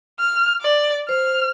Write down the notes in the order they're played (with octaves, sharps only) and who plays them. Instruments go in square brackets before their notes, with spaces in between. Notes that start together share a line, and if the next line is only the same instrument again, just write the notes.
[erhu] F6
D5
[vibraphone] C5 [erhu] F6